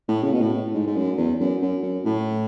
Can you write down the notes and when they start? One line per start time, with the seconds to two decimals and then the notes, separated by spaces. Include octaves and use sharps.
0.08 A2
0.23 C#3
0.33 B2
0.41 A2
0.74 G#2
0.86 G#2
0.96 F#2
1.17 E2
1.40 F#2
1.62 F#2
1.83 F#2
2.05 A2